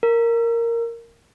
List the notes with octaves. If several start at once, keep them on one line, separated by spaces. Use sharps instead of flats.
A#4